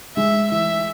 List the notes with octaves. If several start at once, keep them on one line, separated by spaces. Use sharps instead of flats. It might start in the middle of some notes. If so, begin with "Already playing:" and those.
G#3 E5
E3 E5